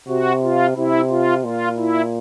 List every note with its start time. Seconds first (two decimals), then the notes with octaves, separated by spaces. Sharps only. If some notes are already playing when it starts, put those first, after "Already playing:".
0.08 C3 F#4
0.42 F4
0.77 C3 E4
1.10 F4
1.44 A#2 F4
1.78 E4